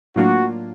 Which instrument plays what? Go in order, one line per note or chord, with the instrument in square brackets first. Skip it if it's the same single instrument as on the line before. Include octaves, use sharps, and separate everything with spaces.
[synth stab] A2 F#3 A#3 D4 F4 [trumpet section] F#4